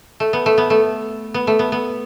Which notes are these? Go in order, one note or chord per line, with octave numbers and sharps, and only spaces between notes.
A3
B3
A3
B3
A3
B3
A3
B3
B3